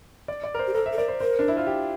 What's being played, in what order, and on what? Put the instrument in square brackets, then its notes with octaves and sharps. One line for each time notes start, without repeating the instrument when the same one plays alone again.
[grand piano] D5
D5
A#4
C5
[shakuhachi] G4
[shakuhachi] A4 [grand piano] A#4
[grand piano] E5
[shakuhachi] A4
[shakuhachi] A#4 [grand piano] D5
[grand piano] C5
[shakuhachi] A#4 [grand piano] C5
[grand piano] D4
E4
F4
G4